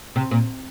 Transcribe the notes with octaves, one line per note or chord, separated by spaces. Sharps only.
C3
A#2